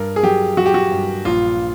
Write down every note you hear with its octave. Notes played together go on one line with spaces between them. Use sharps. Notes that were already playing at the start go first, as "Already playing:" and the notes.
Already playing: G2 A#4
G#4
F#3 G4
F#3 F#4
G4
F#4
G2
A#1 F4